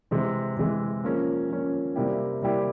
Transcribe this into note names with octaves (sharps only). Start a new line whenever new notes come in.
C3 E3 G#3
C3 E3 G#3
F3 A#3 C#4
F3 A#3 C#4
C3 G3 A#3 E4 G4
C3 G3 A#3 E4 G4